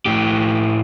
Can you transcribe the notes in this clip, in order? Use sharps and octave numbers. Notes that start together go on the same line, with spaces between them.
A2 G4